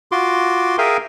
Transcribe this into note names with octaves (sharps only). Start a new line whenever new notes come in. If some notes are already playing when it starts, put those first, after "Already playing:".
F4 F#4 C6 D6
G#4 A#4 E5 F5 G5 G#5